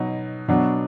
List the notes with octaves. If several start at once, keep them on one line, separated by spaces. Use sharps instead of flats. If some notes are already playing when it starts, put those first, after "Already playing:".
Already playing: B2 F#3 D#4
B2 F#3 D4